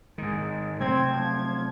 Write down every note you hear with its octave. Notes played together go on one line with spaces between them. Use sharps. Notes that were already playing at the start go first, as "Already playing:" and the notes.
G#2 D#3 G#3
C3 F#3 A3 C4 G#6
F3